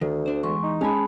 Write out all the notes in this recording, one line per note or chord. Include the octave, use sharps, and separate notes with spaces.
D2 D#3
D4 C5
E2 G#3 C6 C#6
D#4
G#3 C#4 G#5 A5 B5